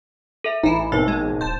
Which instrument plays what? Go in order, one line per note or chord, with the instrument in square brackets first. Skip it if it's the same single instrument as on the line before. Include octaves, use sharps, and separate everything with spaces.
[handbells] A4 E5
[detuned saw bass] A1 [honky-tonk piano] E3 [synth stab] D#4 E4
[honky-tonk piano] B1 C4 A#4 [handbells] D#4 [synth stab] A4
[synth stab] G#3
[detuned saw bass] D1 [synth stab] C5 A5